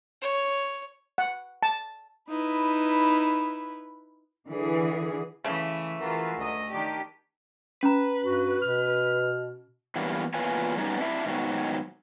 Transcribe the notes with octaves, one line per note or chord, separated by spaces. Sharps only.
C#5
F#5
A5
D#4 E4 B4
D3 E3 G#4
C#3 E3 A3
E3 F4 F#4 G#4 A#4
D2 D#5
D#3 D4 G4
C#4 B4 A#5
G2 F#4
B2 F6
E3 F#3 G3 A#3 B3 D4
E2 A#2 F4 B4 C#5 G#5
F#3 G3 B3 C#4 D#4 D5
C4 D4 E4 E5
G#2 B2 D#3 F#3